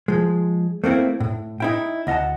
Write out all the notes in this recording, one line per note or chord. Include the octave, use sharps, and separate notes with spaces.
F3 G#3
A3 A#3 C4 E4
A2
D#4 E4 G5
D2 D#5 F5 F#5 A5